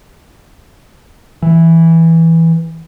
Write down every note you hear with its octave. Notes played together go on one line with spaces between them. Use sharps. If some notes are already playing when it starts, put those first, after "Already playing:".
E3